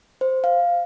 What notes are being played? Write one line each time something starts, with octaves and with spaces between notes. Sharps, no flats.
C5
F5